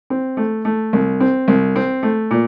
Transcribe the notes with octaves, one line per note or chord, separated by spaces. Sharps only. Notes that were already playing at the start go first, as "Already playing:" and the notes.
C4
A3
A3
C2
C4
C2
C4
A3
A#2